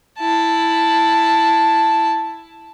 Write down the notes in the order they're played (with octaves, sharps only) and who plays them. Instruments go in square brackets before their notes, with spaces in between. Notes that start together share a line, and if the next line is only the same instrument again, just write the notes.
[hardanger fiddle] E4 A5